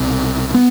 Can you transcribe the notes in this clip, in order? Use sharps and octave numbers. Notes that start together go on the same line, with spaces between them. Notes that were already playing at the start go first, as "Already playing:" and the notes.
Already playing: C2 B2 C4
B3